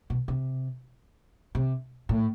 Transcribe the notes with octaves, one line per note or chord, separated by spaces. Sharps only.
B2
C3
C3
A2